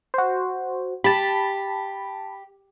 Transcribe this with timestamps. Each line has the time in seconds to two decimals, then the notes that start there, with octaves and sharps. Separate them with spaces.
0.14 F#4 C5
1.04 G4 A5 B5